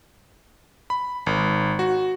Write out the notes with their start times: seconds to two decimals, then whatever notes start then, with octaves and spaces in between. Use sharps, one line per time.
0.90 B5
1.26 G#1
1.79 F#4